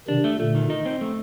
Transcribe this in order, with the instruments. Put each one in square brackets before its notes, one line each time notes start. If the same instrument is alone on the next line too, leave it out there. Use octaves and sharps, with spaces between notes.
[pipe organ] C3 D#3 [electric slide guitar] D4
[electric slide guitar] A3
[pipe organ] A#2 D3 [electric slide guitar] A3
[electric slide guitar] D#3
D#4
C4
A3